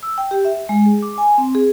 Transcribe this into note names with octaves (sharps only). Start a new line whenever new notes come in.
E6
G5
G4
E5
G#3
G#4
D6
G#5
C4
G#4